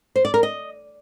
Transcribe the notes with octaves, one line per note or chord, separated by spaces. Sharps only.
C5
D5
A#4
D#5